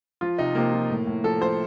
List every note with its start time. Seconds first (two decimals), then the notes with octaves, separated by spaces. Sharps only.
0.21 F3 F4
0.38 C3 D#4
0.55 C3 A#3
0.73 F3
0.90 A2
1.07 A2
1.24 F3 A4
1.41 F3 C5